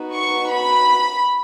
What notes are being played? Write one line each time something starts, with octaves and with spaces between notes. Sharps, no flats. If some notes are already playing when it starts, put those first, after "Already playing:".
Already playing: B3 D#4 F#4
C#6
B5